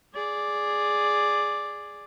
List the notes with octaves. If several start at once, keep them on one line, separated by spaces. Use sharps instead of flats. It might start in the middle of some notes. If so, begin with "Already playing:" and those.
G#4 D5